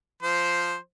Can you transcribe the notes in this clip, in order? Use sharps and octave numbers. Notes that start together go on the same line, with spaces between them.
F3 C5